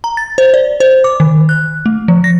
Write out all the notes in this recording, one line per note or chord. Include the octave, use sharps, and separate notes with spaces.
A#5
A6
C5
D5
C5
D6
D#3
F#6
A3
F3
A#6